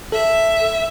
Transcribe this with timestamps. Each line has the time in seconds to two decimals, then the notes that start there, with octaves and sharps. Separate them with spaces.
0.12 A4 E5